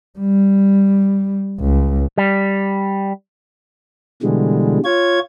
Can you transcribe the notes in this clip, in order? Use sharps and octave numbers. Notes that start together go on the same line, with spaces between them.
G3
C#2
G3
B2 D3 E3 G3 G#3
F4 C#5 G#6